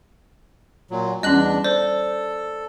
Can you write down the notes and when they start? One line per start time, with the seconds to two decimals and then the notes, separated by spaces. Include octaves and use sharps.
0.91 A#2 F#3
1.23 E2 G3 C#4 D4 D#5 F#6 F#7
1.64 A4 C5 D5